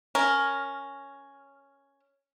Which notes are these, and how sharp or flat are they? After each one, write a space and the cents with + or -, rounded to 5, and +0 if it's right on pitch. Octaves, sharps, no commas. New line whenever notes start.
C#4 +0 A#4 +0